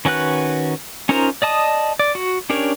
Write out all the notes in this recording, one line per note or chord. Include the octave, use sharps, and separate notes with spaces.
D#3 C#4 F#4 B4 F#6
C#4 D#4 F4 A#4 C5
D5 D#5 A5 D#6
D5
F#4
C#4 D4 G4 A#4 C#5